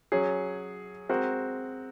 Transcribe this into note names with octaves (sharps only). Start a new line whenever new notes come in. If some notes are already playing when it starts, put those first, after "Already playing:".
F#3 C#4 G#4
G#3 C4 F#4 A#4